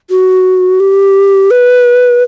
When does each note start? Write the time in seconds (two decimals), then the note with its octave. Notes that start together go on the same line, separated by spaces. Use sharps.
0.10 F#4
0.80 G4
1.51 B4